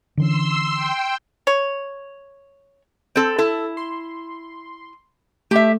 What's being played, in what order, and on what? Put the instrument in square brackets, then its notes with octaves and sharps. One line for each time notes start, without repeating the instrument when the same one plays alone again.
[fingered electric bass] D3 E3 C#4 [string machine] C6 E6
[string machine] G5
[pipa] C#5
[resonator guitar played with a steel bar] C4 A4
[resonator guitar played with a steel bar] E4 [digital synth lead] A4
[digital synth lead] C6
[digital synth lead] A3 [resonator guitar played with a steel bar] G4 E5